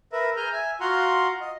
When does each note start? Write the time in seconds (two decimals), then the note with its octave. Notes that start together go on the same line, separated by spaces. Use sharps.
0.12 A#4 B4 E5
0.37 G#4 A#5 F6 G6
0.52 E5 G#5
0.80 F4 F#4 F5 F#5 A#5 C6
1.41 D#5